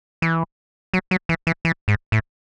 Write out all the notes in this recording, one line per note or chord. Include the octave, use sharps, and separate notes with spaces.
E3
F#3
F#3
E3
E3
E3
G#2
A2